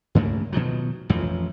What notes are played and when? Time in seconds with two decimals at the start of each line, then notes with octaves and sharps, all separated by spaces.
0.15 G2 C#3 A3 A#3
0.53 B2 D#3 F3 F#3
1.09 A1 F2 E3 F3